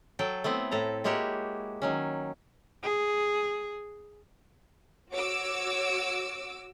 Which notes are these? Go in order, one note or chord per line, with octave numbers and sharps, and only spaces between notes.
F#3 A4 G5
A3 B3 C4 E4
A2 A4 A#5
G#3 A#3 E4 F#4 G4 C#5
D#3 F#3 C#4
G#4
F#4 C#5 D6 E6 D7